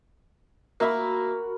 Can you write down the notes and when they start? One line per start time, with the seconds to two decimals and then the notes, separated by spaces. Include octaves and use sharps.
0.80 A#3 F#4 A#4 E5 B5